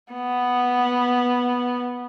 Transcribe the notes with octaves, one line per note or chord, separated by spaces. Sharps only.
B3